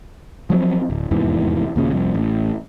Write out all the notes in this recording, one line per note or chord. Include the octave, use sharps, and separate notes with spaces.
F3 F#3 A3 C4
D1
F1 E2 G#2 E3
D#2 A#2 C#3
C2 F2
A1